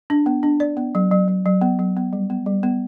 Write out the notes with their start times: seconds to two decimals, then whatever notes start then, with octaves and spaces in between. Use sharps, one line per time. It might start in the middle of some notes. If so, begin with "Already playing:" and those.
0.10 D4
0.26 B3
0.43 D4
0.60 D5
0.77 B3
0.95 F#3
1.11 F#3
1.28 F#3
1.46 F#3
1.61 B3
1.79 F#3
1.97 B3
2.13 G3
2.30 B3
2.46 G3
2.63 B3